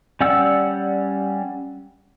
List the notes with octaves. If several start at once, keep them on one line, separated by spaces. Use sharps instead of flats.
G3 C#4 D5 F#5 E6